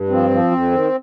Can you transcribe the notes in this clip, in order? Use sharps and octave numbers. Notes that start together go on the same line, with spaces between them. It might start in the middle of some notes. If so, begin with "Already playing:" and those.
Already playing: G2
F3 C4
F3
F2
D#3